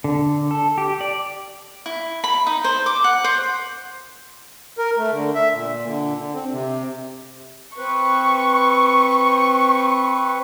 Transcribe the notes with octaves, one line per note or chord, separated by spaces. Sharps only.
D3
A4
G4
D5
E4
B5
D#4
C5
D6
F#5
C5
A#4
A3
D3
E5
A#2
D3
D3
C4
C3
C4 B4 C#6